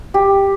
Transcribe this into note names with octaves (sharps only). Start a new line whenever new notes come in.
G4